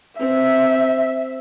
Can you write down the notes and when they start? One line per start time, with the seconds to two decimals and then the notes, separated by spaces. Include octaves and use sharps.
0.20 C4 E5